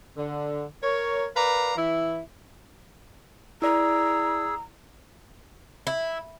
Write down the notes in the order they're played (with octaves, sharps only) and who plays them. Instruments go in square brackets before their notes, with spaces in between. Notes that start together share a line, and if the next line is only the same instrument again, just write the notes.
[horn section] D3
A#4 C#5
A#4 B4 D5 F5 A#5
E3 E4
[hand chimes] E4 D5 [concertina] G#4 E6 [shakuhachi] A#5
[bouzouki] E4